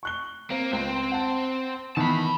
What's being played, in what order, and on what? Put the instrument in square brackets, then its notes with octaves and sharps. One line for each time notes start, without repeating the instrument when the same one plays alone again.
[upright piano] C#6 F#6 G7
[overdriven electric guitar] A#3 [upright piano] C4
[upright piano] C#2 [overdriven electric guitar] C4
[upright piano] F#5 A5
[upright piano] D#3 E3 B3 [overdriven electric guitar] A5 B5